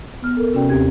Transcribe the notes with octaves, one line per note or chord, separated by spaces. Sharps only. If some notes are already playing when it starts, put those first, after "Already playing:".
B3 F6
A4 A#4
C3 C#4 F#4 B4 D5 G5
D#2 C4 G4 G#6